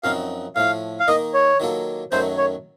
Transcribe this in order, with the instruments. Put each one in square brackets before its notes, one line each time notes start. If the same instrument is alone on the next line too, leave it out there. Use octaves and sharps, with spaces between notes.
[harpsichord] F#2 F3 C4 D#4 F#4 [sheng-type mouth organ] F5
[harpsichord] A2 F3 A3 [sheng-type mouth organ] F5
[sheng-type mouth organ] F5
[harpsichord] D#3 A#3 D#4 A#4 [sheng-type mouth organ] D#5
[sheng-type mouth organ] C#5
[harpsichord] D#3 F#3 A#3 F4 A4
[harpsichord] F#2 D#3 F#3 A3 C#4 [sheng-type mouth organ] C5
[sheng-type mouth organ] C#5